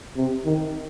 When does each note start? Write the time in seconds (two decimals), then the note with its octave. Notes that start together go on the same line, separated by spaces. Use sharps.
0.16 C3
0.45 D#3